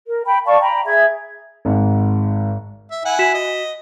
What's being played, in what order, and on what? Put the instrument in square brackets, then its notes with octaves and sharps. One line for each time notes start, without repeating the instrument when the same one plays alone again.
[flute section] A#4
G5 B5
D5 F5 A5 C#6
G5 A#5 B5
G#4 E5 G#6
[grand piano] G#1 G#2
[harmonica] E5
E4 F#5 G#5
[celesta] F#4 B6 E7
[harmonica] D#5